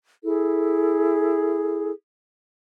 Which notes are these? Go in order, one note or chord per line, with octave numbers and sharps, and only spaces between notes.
E4 G#4 A4